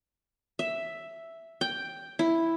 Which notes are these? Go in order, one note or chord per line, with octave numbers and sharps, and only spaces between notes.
E5
G5
E4